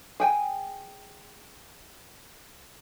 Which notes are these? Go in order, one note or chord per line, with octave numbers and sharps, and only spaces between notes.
G#4 G5 G#5